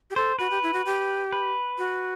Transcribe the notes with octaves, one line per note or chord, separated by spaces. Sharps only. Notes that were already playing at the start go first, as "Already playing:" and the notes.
G4
A4 C5
F#4 B4
G4
E4
F#4
G4
B4
F#4